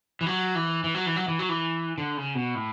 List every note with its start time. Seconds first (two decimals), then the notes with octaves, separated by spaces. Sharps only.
0.21 E3
0.26 F#3
0.55 E3
0.84 E3
0.94 F#3
1.06 E3
1.16 F#3
1.28 E3
1.39 F#3
1.49 E3
1.98 D3
2.17 C#3
2.35 B2
2.55 A2